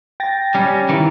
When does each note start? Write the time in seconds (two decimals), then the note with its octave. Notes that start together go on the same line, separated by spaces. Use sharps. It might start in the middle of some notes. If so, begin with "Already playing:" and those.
0.20 G5 A6 A#6
0.55 G3 C#4
0.89 D#3 E3